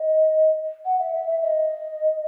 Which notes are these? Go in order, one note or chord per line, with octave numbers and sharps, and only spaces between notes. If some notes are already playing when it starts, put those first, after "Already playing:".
Already playing: D#5
F#5
E5
E5
E5
D#5